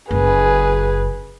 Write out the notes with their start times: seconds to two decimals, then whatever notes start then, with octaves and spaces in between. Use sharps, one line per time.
0.11 F#1 G#4 B4